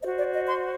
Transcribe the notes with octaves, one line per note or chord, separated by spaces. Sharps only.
F#4 C5 D#5
D5
D#5
C6